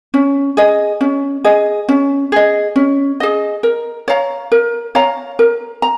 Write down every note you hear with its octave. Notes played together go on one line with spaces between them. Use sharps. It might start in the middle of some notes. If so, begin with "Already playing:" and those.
C#4
G#4 D#5
C#4
G#4 D#5
C#4
G#4 D#5
C#4
G#4 D#5
A#4
C#5 F5 A#5
A#4
C#5 F5 A#5
A#4
A#5